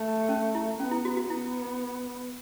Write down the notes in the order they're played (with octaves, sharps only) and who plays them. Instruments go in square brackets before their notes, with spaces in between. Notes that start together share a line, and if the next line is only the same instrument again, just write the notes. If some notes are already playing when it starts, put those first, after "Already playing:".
Already playing: [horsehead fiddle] A3
[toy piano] C#4
E4
[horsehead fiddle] B3 [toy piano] C#4
[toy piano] E4
F#4
F#4
[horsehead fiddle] B3 [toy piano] E4